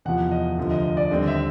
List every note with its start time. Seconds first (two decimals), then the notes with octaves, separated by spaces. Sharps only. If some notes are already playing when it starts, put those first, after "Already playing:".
0.05 E2 C3 F3 F#5
0.31 D#5
0.58 D2 C3 F3
0.71 D#5
0.84 D#5
0.97 D5
1.10 D#2 D3 G3 C4 D#5
1.27 E5